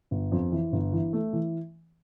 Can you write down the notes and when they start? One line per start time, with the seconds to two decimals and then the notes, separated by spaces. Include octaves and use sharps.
0.11 G1
0.32 F2
0.52 E3
0.72 G1
0.92 E3
1.13 A3
1.33 E3